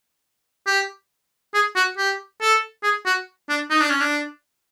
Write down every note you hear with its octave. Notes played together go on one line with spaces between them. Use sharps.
G4
G#4
F#4
G4
A4
G#4
F#4
D4
D#4
D4
C#4
D4